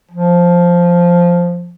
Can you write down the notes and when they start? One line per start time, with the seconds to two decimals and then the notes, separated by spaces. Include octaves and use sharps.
0.11 F3